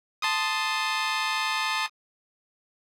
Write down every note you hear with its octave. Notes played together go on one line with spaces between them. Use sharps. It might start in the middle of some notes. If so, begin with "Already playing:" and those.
A5 C6 D#6